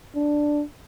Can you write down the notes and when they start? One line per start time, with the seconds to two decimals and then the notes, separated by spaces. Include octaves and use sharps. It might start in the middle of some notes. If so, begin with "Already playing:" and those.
0.15 D4